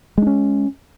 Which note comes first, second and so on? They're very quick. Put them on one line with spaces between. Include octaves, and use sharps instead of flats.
G#3 D4 C#4